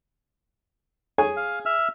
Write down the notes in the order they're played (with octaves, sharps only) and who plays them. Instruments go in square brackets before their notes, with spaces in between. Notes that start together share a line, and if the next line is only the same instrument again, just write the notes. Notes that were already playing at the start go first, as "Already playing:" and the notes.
[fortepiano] G#4 C#5 G#5
[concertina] F5
E5 E6 F6